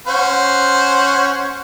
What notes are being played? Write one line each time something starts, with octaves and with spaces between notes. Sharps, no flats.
C#4 C5 F#5